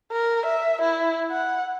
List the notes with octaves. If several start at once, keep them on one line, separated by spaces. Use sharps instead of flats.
A#4
E5
E4
F#5